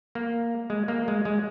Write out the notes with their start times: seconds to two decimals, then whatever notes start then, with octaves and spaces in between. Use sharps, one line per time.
0.15 A#3
0.70 G#3
0.88 A#3
1.08 G#3
1.25 G#3